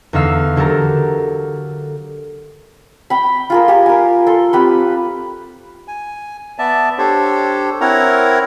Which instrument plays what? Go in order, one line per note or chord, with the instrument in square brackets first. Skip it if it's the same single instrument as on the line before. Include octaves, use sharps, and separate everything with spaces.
[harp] E2 D3 D#4 F5 E6
D3 F#3 G4 A4 A#4
[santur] G5 B5
F4 G#4 A#4
G4 G#5
A#4 G#5
A4 C6
C4 G4 B4
[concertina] G#5
B3 D5 E5 A5
D4 G4 A4 C5 C#5
C4 E4 A#4 C#5 F#5 A#5